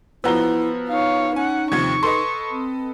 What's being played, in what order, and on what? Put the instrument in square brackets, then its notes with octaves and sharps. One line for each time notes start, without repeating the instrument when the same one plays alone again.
[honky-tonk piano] F3 F#4 E6 [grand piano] B3 A#5 G7 [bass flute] E4
[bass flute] D#4 [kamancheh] C#5 F5
[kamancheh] C#4 F#5 [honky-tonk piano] G#5
[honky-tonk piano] D#2 C3 F3 [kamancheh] C#6 [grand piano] G#6
[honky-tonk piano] A4 B4 D#5 [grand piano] C6
[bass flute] C4